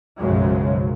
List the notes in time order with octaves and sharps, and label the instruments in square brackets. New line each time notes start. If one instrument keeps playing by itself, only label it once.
[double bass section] B1 F#2 C#3 F3 F#3 G#3